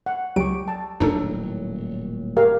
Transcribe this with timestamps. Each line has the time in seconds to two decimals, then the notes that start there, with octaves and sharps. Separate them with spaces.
0.06 F#5
0.36 C#2 F#3 G4 C#6 D7
0.68 A5
1.00 D#1 A2 F#3 D4 D#4 A4
2.37 G4 A#4 F5